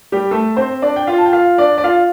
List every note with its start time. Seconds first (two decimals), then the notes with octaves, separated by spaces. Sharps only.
0.12 G3 G4
0.31 A3 A4
0.56 C4 C5
0.82 D4 D5
0.96 G5
1.07 F4 F5
1.18 A5
1.26 G5
1.33 F4 F5
1.58 D4 D5
1.78 D5
1.84 F4 F5